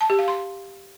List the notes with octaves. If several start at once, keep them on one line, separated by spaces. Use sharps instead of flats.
A5
G4
F5
C6